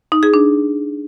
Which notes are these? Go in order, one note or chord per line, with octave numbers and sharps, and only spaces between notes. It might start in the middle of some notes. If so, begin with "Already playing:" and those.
D#4
G#4
D4